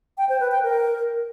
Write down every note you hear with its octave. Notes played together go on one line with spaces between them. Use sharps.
G5
C5
B4
G5
A#4